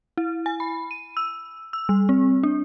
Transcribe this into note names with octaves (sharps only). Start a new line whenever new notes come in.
E4
G#5
B5
D#7
E6
E6
G3
C4
D4